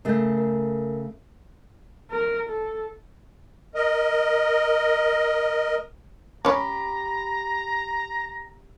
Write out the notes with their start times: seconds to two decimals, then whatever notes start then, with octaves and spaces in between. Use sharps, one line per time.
0.05 C#3 A3 A#4 G6
0.38 A#4
2.11 A#4
2.49 A4
3.75 A#4 D#5
6.45 C#4 G4 C#5 A#5 B5 D6